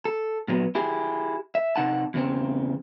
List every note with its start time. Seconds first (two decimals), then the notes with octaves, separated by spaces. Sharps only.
0.05 A4
0.48 A#2 F#3 B3
0.75 E4 G4 G#4
1.55 E5
1.76 C3 D#4 F#5 A5
2.14 E2 C#3 C4